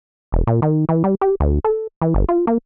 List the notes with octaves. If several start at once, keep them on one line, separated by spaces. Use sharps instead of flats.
E1
A#2
D#3
E3
G3
G4
D2
A4
E3
G1
F4
A#3